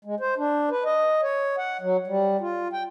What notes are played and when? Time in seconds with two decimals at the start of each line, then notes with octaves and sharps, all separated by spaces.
0.05 G#3
0.20 C5
0.37 D4
0.70 B4
0.85 D#5
1.23 C#5
1.58 F#5
1.81 F#3
2.07 G3
2.41 F4
2.73 G5